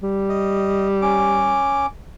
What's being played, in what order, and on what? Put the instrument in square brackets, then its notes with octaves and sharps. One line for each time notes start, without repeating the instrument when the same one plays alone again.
[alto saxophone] G3
[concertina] D#5
C#4 D6